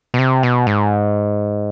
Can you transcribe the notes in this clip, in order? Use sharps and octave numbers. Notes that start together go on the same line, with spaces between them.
B2
C3
B2
G#2